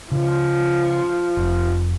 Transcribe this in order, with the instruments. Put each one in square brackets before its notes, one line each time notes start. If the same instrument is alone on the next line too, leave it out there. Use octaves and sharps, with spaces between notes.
[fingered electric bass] C#3 [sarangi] F3
[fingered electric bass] F1